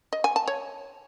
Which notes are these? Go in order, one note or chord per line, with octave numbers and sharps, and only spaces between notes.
D#5
G#5
A5
C#5